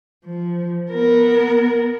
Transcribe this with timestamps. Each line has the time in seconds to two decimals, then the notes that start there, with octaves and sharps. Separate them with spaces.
0.25 F3
0.91 B3 A#4